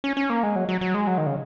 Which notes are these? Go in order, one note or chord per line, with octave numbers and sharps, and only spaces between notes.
C#4
C#4
A#3
G#3
F#3
F#3
F#3
G#3
F#3
D#3
C#3